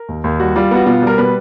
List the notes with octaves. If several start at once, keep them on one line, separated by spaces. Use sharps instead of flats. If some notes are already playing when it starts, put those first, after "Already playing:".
Already playing: A#4
D#2
D#2
G3 F#4
G3 F4
B3 F#4
B2 F4
G3 A#4
B2 B4